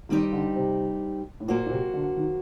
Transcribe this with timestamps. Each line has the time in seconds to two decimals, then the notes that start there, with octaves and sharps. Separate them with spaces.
0.09 D#3 G3 C4 D#4 G4 D5
0.32 D3
0.56 C3
1.40 A2
1.48 A#2 F#3 A#3 F#4 C5
1.66 A#2
1.71 C3
1.94 D3
2.16 D#3